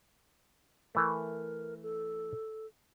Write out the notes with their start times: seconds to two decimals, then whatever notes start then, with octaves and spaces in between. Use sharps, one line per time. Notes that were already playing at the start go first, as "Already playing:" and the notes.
0.95 E3 A3 A#4
1.83 A4